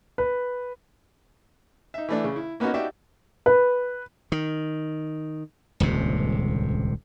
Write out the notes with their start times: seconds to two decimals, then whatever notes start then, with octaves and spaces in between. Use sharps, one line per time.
0.18 B4
1.94 D#4 E5
2.09 E3 A3 D4
2.24 C#3
2.36 E4
2.60 A#3 B3 C#4 D#4 F#4
2.74 D#4 F#4 G4 D5 E5
3.46 B4
4.32 D#3
5.80 D#1 C#2 G2 C3